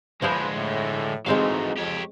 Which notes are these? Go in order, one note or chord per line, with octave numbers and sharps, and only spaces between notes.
A#1 D3 F3 G#3 E4 B4 C5
A2
G#2 E3 F#3 G#3 A3 C4 D#4 F5
F2 G4 C#5